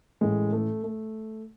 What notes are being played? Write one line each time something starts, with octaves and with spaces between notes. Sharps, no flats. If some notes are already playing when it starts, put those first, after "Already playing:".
A1 A2 E3 G#3
A3
A3